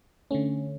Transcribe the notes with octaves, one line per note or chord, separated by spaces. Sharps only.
D3 A3 C#4